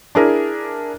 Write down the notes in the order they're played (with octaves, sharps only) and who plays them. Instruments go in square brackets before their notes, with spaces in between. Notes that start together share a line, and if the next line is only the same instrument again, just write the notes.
[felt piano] D4 E4 G#4 A#4